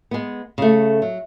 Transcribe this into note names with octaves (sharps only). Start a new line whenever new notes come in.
G#3 B3
C#3 A3
F#3